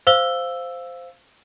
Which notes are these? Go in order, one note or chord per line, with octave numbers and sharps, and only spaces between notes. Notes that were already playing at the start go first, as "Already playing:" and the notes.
C5 F5 E6 G7